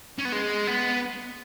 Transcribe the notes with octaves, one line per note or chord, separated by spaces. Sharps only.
C#4
B3
G#3
B3